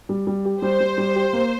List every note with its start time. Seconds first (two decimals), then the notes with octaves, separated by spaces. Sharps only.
0.09 G3
0.27 G3
0.45 G4
0.62 G3 C5
0.80 G3
0.98 G3
1.16 G4
1.33 A#3